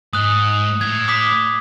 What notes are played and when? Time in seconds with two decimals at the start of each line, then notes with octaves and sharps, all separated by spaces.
0.13 G#2 D#6 F#6
0.81 A2 G#6
1.08 D6 D#6 B6